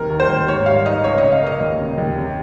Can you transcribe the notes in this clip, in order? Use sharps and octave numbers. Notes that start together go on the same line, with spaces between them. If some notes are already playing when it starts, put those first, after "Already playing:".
Already playing: D#2 C3 A#4
D#3
C5
D#2
G#2 C#5
G3 F5
D#4 D#5
C#2 C#5
D#5
C#3
F5
A#3
D#5
D#2
C#3
D#2
C3